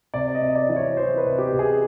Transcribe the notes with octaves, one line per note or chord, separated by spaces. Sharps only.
C3 D5
D#5
C3
D5
E3
C#5
E3 C5
B4
C3
G4
C3
G#4